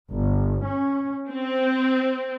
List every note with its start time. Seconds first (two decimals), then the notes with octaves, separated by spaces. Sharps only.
0.10 G1
0.64 C#4
1.30 C4